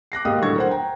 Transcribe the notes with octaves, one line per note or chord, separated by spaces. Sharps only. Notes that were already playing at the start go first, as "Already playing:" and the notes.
D6 F#6 A#6 C7
D#2 G#2 B2 G4 F5 D#6
A2 D3 F#3 A4 C#6 G#6
A#4 C5 F#5
G5 A#5